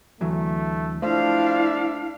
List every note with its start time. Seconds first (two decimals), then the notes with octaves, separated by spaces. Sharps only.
0.21 D2 E3 F#3 A3
1.02 F3 A3 D4 E4 F5